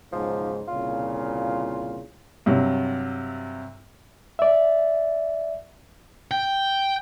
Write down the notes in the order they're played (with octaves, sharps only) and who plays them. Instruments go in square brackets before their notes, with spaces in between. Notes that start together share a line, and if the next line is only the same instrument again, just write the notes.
[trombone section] B1 G#2 C#3 [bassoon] F3
[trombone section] C2 A#2 C#3 [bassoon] F4
[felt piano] G2 C3 F#3
[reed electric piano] D5 E5
[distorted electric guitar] G5